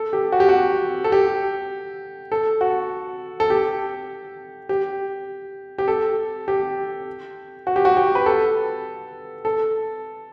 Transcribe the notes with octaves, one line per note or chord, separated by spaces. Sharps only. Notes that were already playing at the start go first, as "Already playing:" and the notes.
Already playing: A4
G4
F#4
G4
F#4
A4
G4
A4
F#4
A4
G4
G4
G4
A4
G4
F#4
G4
F#4
G4
B4
A4
A4